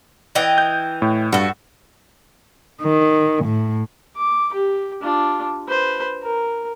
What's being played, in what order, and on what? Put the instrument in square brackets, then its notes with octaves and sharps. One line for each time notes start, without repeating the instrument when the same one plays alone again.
[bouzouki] E3 D#5 G5
[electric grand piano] G6
A2
[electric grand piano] G2 [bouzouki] F#4 A4
[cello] D#3
A2
[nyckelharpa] D6
G4
D4 F4
B4 C5
A#4